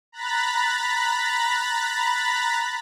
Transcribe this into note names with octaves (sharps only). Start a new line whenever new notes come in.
A#5 B5 F#6 A6 B6